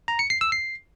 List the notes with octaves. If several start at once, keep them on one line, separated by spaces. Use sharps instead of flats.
A#5
C#7
C7
E6
C7